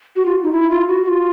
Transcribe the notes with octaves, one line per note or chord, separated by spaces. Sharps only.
F#4
F4
D#4
E4
F4
F#4
F#4
F4